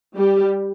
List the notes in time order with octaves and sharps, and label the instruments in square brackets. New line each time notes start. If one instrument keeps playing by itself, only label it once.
[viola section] G3 G4